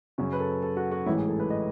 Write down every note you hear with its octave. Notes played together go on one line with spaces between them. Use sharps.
F#2 C#3 F#3 C#4
B4
A4
A4
F#4
F#4
A1 G#2 E3 E4
G#4
A4
B4
D#5